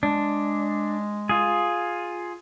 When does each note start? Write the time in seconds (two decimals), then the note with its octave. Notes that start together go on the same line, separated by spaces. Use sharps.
0.03 G#3 D4
1.29 F4 G#4